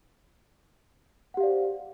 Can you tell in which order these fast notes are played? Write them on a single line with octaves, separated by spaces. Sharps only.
F#5 G4 F5 D5 C5